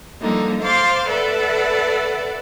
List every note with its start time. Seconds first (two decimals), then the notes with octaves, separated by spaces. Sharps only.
0.21 D3 F3 G3 A#3 D#4
0.62 C5 F5 C6 D6 A6
1.08 A4 B4 D5 E5 F#5